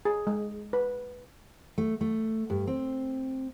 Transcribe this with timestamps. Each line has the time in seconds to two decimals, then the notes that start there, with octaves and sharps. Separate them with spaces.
0.05 G#4
0.27 G#3
0.73 B4
1.78 A3
2.01 A3
2.50 G2
2.67 C4